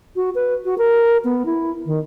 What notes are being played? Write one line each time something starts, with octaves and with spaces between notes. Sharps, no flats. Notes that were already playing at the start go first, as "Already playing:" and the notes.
F#4
B4
F#4
A#4
B3
E4
D#3